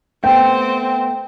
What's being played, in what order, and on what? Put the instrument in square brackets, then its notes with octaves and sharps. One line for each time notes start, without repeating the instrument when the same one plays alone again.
[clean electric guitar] A3 B3 [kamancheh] C4 [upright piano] G5